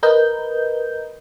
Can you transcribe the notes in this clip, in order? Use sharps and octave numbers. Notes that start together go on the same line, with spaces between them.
A#4 B4 D#5 G6